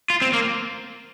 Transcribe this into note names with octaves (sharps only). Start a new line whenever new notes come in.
F4
C4
A#3